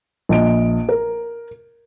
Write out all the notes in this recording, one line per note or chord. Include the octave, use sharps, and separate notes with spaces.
A#1 D#5 D7
A#4